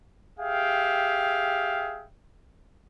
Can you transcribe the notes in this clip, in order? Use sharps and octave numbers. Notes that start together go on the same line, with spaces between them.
G4 G#4 E5 F5 G5